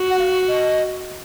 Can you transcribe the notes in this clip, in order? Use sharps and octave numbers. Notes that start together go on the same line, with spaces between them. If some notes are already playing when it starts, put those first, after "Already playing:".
Already playing: F#4
F#5
F5
D#5